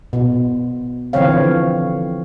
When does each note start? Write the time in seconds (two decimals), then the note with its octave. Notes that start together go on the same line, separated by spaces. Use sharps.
0.13 B2
1.13 D3 E3 F3 C4 C#5 F5